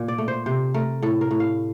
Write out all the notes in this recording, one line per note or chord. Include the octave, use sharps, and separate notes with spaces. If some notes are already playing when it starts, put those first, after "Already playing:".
Already playing: A#2
D5
A3
C5
C3 C5
A3 A#4
A2 A4
A#4
A2
F5